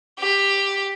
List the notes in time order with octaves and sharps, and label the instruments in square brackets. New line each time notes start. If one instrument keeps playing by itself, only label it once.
[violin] G4